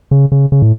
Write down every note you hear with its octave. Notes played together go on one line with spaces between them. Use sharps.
C#3
C#3
C#3
A2